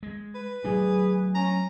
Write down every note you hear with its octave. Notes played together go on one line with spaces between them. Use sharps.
G#3
B4
F#3 A3 D4 G#4
C#4 A#5